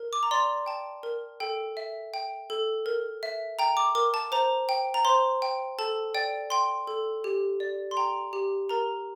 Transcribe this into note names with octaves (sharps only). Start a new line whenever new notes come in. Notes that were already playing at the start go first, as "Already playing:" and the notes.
Already playing: A#4
D6
A#5
D5 C6
G5 A5
A#4
A4 G5
E5
G5
A4
A#4
E5
G5 A#5
D6
A#4 D6
A5
C5 A#5
G5
A#5
C5 C6
G5
A4 A5
D5 G5
G5 C6
A4
G4
D5
C6
G5 A#5
G4
A#4 A#5